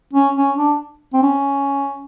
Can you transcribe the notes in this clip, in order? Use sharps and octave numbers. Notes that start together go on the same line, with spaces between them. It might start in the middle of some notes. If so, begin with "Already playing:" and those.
C#4
C#4
D4
C4
C#4